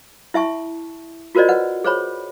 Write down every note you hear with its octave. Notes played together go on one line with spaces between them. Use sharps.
E4 E5 A5 C#6
F4 F#4 A#4 C5 D5 D#5
B4 F#5
G#4 C5 C#5 B5